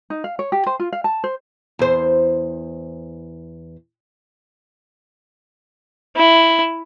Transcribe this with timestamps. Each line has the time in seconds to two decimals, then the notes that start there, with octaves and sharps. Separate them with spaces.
0.10 D#4
0.24 F5
0.39 C#5
0.52 G4
0.66 C5
0.80 F4
0.93 F5
1.04 A5
1.24 C5
1.79 E2 C5
6.17 E4